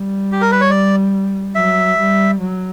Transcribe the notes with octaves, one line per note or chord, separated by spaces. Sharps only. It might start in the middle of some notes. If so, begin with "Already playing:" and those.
Already playing: G3
G4
A#4
B4
C#5
D5
F#3 E5
G3
F#3